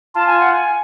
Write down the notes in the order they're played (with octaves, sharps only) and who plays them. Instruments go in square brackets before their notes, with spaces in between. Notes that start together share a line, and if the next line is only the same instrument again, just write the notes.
[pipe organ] F4 [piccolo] A5
[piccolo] G#5
F#5
G#5